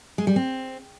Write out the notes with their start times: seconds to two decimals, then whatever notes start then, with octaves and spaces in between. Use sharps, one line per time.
0.18 G#3
0.27 G3
0.36 C4